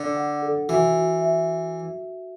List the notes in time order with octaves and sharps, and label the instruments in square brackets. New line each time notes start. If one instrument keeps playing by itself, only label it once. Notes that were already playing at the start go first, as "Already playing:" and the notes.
Already playing: [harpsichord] D3 [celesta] D4
[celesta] F#5
A4
[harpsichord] E3 [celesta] F#4
[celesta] F#4
E5